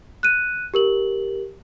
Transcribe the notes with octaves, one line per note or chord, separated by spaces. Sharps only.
F#6 D#7
G4 A#4 F#7